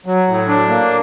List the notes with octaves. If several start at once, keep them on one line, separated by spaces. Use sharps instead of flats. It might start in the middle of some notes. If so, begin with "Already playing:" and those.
F#3
A2
D4
A#3